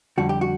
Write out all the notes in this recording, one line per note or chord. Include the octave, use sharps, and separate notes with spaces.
F2 D3 G3 F#4
G4
F#4